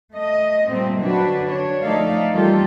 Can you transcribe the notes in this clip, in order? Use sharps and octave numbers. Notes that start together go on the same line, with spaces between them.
A3 D#5
A#2 G3 A3 C4
D3 F#3 D4 F#4 B4
D4 C#5
F3 A3 D#4 A4 D5 F5
E3 G3 A#3 F4 G4 A4